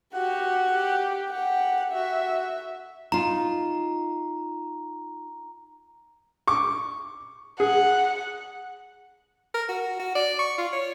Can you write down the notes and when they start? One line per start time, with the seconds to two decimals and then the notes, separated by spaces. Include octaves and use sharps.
0.14 F#4 G4 F#5
0.74 G4
1.30 G4 F#5
1.93 F#4 E5
3.12 D#4 F4 A#5
6.47 C#6 D6
7.60 G#4 F#5
9.54 A#4
9.69 F#4
9.99 F#4
10.15 D5
10.39 C#6
10.58 F4
10.73 C#5